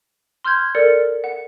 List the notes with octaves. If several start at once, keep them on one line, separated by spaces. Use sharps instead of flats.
C6 F6 G6 G#6
A4 A#4 D5 F6 C#7
F#5